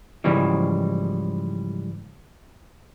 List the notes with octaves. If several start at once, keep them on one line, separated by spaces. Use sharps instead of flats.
G#2 C#3 E3 F3 G3